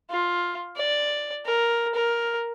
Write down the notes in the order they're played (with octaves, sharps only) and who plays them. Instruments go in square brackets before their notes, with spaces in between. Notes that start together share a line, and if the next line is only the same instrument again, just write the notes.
[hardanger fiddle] F4
D5
A#4
A#4